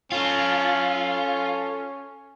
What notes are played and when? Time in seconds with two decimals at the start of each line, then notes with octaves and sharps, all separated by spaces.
0.12 C#4 F4 A4 F5